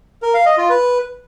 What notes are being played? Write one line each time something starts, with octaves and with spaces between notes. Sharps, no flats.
A#4
F5
D#5
F4
B4